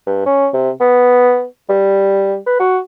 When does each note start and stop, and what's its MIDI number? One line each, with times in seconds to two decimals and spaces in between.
0.07 0.26 43
0.26 0.48 61
0.54 0.70 48
0.81 1.45 59
1.69 2.37 55
2.46 2.57 71
2.60 2.79 66